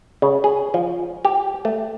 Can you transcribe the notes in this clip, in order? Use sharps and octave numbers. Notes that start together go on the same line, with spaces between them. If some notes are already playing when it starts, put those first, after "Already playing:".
C#3
G#4
F3
G4
A3